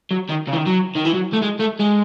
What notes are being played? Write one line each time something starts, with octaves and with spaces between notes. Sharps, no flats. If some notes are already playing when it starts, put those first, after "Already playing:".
F#3
D#3
C#3
E3
D#3
F#3
D#3
E3
F#3
A3
G#3
A3
G#3